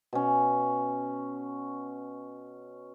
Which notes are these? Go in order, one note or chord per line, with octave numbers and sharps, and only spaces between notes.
B2 C#4